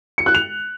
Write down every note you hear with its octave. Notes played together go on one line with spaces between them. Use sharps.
C#7
F#6
F7